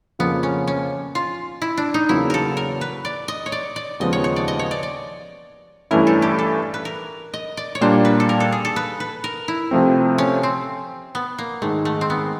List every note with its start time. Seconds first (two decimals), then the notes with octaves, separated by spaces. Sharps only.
0.19 F2 C#3 F3 A#3 B3
0.43 C#4
0.68 C#4
1.15 F4
1.62 E4
1.77 D4
1.94 D#4
2.09 E2 C#3 F#3 A#3 E4
2.30 A4 A#4
2.57 A#4
2.81 B4
3.05 D5
3.28 D#5
3.46 C#5
3.52 D5
3.76 D5
4.00 D#2 C#3 F3 G#3 B3 D#5
4.13 C#5
4.24 C#5
4.36 D5
4.48 D#5
4.59 C#5
4.71 D5
4.83 D5
5.91 G2 E3 A3 C#4 E4 A#4
6.07 A4
6.22 G4
6.39 A4
6.74 B4
6.85 A#4
7.34 D#5
7.57 D5
7.75 C#5
7.81 A#2 G3 A#3 D4 C5
8.05 B4
8.20 A4
8.29 A#4
8.40 A4
8.52 G#4
8.65 A4
8.76 B4
9.00 B4
9.24 A#4
9.48 E4
9.71 C3 F3 A3 C4
10.18 C#4
10.43 C4
11.15 B3
11.38 A#3
11.62 G#2 D#3 G#3 A3
11.85 A3
12.01 C4
12.10 B3